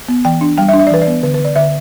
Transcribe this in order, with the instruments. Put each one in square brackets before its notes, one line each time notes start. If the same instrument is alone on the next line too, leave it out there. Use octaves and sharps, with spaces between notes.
[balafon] B3
E3 G5
D4
G3 G5
E5
D4
E5
D5
E3 B4
D5
B3
D3 B4
B4
D3
D5
D3 E5